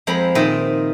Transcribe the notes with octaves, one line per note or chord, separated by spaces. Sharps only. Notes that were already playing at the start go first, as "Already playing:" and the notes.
F2 G#3 C4 A#5 B5
A#2 D#3 C4 D#5 E5